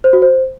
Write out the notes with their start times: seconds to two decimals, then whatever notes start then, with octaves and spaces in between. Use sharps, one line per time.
0.04 C5
0.13 F#4
0.22 C5